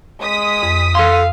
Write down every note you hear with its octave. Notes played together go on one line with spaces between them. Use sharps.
G#3 D#6 B6
F2
A4 F5 C6